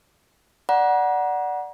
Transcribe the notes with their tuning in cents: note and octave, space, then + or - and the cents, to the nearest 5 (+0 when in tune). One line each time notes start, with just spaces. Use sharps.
D5 +0 F#5 +0 A#5 +40